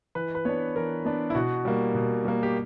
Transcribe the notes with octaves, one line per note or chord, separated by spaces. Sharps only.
E3 B4
B4
B3 D4 C#5
E3 A#4
B3 D4
E4
B2 F#4
G3 A#3
B2
G3 A#3
G4